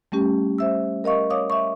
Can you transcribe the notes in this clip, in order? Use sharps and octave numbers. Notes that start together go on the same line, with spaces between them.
G3 A3 C#4 G4
C5 E5 E6
A#4 D#5 F5 C#6
C#5 F5 D6 D#6
E5 C#6